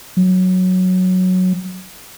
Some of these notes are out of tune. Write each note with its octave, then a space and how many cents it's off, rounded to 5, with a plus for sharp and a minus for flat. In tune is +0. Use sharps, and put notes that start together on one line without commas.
F#3 -5